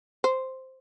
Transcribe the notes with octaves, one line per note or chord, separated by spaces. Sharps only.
C5